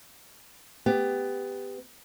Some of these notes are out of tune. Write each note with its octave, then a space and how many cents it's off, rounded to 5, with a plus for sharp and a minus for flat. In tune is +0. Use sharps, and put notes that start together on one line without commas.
B3 +15 G4 +15